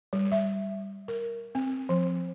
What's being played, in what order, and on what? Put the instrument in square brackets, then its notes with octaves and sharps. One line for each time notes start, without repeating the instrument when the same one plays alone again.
[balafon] G3
E5
A#4
C4
F3